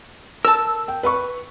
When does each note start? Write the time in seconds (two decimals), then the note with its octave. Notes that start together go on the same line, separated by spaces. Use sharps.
0.45 A#4 A5 E6
0.88 G5
1.03 B4 B5 C#6